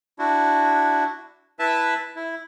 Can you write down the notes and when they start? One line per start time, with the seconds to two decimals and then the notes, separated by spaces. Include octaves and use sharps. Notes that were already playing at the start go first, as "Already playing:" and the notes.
0.19 D4 E4 F#4
1.59 E4 B4 E5 A5
2.16 E4